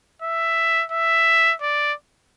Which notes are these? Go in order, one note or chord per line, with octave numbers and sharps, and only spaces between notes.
E5
E5
D5